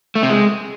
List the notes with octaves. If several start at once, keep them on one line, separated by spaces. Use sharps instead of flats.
A3
C3
G#3